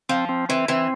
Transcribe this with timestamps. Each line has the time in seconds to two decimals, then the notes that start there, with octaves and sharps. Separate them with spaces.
0.09 F3 C4
0.29 C4
0.49 E3 C4
0.68 E3 C4